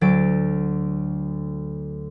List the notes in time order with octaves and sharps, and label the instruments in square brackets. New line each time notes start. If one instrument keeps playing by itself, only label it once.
[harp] D2 F#3 A6 D7